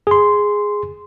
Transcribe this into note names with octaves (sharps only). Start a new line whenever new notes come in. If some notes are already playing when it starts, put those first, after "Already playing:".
G#4 C6